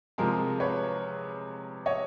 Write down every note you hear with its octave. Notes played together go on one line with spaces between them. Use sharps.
C3 F3 G#3 C4 G#4 A#4
B4 C#5
C#5 D#5